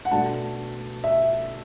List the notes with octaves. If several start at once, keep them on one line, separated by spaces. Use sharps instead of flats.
F#5
B2 A3 D4 A5
E5